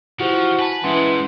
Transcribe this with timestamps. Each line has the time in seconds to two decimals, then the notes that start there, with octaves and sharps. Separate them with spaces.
0.20 F3 E4 F#4 G4 C5
0.59 B4 G#5 A5
0.84 G#2 E3 G#3 C#4 F#5 C6